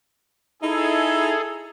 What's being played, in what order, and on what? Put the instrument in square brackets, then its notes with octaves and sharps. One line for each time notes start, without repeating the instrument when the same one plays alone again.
[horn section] D#4 E4 [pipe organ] G#4 A4